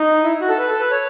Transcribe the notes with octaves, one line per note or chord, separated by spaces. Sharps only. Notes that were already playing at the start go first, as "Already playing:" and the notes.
Already playing: D#4
E4
F#4
A4
B4
A4
B4
C#5